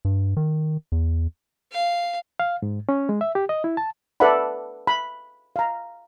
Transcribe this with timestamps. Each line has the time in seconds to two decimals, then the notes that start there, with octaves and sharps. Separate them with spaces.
0.05 G2
0.37 D#3
0.92 E2
1.72 F5
2.40 F5
2.62 G#2
2.89 C#4
3.09 G#3
3.21 E5
3.35 G4
3.49 D#5
3.64 E4
3.77 A5
4.20 A4 B4 D5 E5 F#5 B5
4.87 B5
5.56 F5 A#5